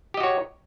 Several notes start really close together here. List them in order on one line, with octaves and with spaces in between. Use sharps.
G4 D#5 F#4 C#5